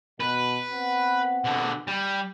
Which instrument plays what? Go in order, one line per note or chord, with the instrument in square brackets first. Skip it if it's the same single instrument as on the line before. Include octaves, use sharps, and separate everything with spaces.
[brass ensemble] B2 [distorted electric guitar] B4
[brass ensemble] B3 C4 F#5
[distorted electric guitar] B2 D3
G3